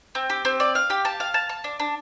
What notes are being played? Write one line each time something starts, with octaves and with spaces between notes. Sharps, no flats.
C4
G4
C4
D5
F5
G4
A5
F5
A5
A5
D4
D4